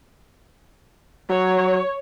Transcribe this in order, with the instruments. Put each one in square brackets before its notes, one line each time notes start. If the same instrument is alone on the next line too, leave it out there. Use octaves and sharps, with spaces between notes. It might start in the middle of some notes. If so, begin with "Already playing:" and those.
[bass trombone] F#3 [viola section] C#5